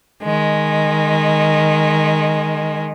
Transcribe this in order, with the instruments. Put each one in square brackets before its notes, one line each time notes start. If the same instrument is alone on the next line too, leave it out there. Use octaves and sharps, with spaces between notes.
[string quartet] D#3 G#3